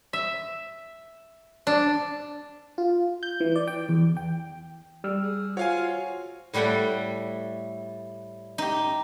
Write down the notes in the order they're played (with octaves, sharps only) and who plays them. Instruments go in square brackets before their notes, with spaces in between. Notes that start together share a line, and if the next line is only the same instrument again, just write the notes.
[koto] E5
D4
[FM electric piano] F4
G6
E3
D5
G5
E2
G5
[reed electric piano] G3 E6 F6
[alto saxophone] G#4
[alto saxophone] F4 [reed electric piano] F#4 C5 [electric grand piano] C#5 F5 G#5
[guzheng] A2 G3 A3 F#5 G5
D#4 G4